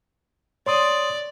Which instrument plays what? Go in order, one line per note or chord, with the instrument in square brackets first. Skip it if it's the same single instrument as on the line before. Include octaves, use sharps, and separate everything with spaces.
[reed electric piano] C#5 C6 D#6 [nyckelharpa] D5